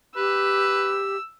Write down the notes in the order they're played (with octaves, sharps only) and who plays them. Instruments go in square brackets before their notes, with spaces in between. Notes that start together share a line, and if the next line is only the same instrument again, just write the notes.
[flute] G4 [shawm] B4 [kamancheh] E6